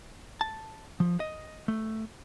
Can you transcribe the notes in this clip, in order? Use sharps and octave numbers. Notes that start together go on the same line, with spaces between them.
A5
F3
D#5
A3